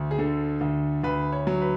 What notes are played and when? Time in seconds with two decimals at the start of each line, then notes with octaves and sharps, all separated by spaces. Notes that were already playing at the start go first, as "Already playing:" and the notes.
Already playing: D2
0.11 G#4
0.18 D3 A4
0.61 D2
1.04 D2 B4
1.32 C#5
1.47 F#3
1.61 B4